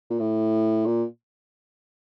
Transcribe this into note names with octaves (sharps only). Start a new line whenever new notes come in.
A#2
A2
A#2